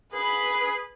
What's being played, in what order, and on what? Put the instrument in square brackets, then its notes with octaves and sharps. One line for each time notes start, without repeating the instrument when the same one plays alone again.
[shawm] G#4 [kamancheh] B4 B5